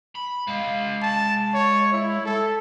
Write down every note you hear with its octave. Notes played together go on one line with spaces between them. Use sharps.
B5
G#3 F5
A5
C#5
E4
A4